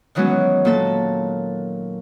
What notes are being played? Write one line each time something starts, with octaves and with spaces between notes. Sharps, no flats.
D#3 E3 F#3 G#3 B3 C#4
A#2 A#3 A4 A5